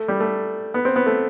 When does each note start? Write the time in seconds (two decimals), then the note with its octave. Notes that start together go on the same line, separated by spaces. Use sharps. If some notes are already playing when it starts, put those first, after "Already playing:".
Already playing: A3
0.08 G3
0.20 A3
0.74 B3
0.85 C4
0.96 B3
1.06 A3